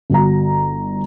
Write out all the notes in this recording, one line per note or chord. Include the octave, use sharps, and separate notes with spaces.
G1 F#4 A#5